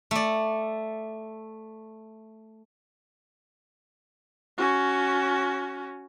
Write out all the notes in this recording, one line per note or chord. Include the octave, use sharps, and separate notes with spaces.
A3 D5
C#4 F#4